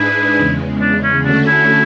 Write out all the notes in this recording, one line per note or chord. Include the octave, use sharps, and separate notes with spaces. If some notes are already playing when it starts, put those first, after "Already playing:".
Already playing: G#2 G#3 D4 E4 G#4 B4
E2 C#3 G#3
D4
C#4
D3 A3 C#4 D4 F#4 A4
E4